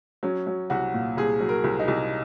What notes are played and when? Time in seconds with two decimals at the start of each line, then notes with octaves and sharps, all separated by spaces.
0.23 F#3 C#4
0.47 F#3
0.70 C2 F#4
0.94 A#2
1.17 C2 G#4
1.40 F#3
1.49 A#4
1.64 C2
1.79 D#4
1.88 C2